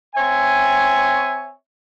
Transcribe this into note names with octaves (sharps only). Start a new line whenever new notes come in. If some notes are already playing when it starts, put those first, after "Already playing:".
C4 C#5 E5 G#5